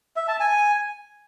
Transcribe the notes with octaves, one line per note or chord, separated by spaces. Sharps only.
E5
A5
G#5